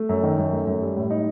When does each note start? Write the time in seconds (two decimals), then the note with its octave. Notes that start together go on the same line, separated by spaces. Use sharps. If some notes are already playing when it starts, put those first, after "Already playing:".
Already playing: A3
0.09 F#2
0.23 D#3
0.38 F#2
0.53 A3
0.67 F#2
0.82 G3
0.97 A2
1.10 D#4